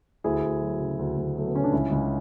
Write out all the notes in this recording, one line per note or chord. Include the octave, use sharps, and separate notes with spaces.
D2 E4 G#4
D2
F#3
C#3
D2
D2
F#3 A3
B3
C#3 C#4
D4
C#2 C#4 E4
C#2